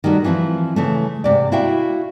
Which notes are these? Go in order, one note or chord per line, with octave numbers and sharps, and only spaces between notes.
D#3 G3 A3 F#4
E3 F3 C4 E4
C#3 E3 A3
G#2 C3 D5
E4 F#4 E5 F5 G5